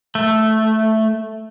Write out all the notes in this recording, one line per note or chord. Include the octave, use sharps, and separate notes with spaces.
A3